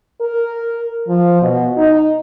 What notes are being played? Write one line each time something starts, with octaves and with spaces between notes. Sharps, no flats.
A#4
F3
B2
D#4